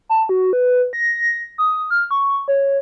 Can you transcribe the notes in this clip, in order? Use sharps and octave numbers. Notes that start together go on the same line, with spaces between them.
A5
F#4
B4
A#6
D#6
F6
C#6
C#5